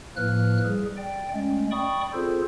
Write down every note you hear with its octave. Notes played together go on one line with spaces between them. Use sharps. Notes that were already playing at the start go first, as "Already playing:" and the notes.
A2 F3 A#3 B4 F6 F#6
G3 G#4
D5 G5
G#3 A3 C#4
D5 G5 B5 C#6 D#6
C4 F4 G#4 A4 C5